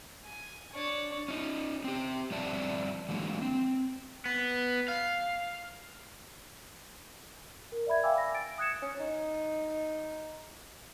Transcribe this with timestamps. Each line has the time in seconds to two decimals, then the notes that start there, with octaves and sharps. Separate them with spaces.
0.25 G#5
0.73 D4 C#5
1.28 C#4 D#4
1.84 C4 G4
2.31 G2 F3 C4 D5 E5 A5
3.09 E3 F#3 G#3 A#3 D4
3.41 C4
4.26 B3
4.88 F5
7.72 A#4
7.87 D5 E5 B5 G#6
8.03 E5 F5 G5 G#5 D6 E6
8.18 A#6
8.34 A6 D7
8.58 D#6 F#6 G#6 C#7 E7
8.82 C#4
9.00 D#4